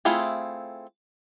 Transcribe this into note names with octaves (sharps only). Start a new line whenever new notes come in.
A3 C4 E4 F4 G#4